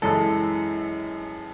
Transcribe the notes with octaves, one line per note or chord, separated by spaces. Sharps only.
F#2 E3 G#3 A4